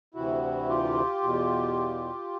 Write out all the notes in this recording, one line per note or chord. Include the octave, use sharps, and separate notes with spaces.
D2 C3 E3 E4 F#4
F4 G4
E2 B2